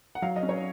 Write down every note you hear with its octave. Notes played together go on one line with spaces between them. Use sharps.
F#5
F#3 F5
D#5
C#4
C#5